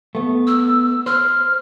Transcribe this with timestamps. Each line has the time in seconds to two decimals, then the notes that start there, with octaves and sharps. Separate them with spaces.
0.15 A3 B3
0.47 E6
1.06 C5 F6